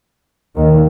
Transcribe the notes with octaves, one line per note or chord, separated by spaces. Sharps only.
D#2 D#3